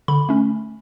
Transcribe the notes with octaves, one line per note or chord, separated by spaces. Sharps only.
D3 B5
A3 C#4